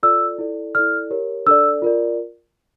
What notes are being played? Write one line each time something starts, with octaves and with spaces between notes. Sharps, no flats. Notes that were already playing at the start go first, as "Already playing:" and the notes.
F4 A4 D5 E6
E4 A4 D5
E4 A4 D5 F6
G4 A#4 C#5
D4 A4 D5 E6
F4 A#4 D5